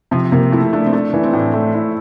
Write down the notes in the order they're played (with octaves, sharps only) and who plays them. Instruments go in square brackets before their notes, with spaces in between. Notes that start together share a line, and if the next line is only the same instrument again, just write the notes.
[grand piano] C3 [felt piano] F3
[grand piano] C3 [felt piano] A#3
[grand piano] A3 [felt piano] E4
[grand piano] A3 [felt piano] D4
[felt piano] C4
[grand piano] A3 [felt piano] D4
[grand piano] E3
[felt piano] C4
[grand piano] A2 [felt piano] D4
[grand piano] A3
E4